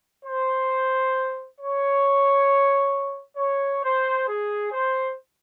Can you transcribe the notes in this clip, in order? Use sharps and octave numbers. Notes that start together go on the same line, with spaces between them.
C5
C#5
C#5
C5
G#4
C5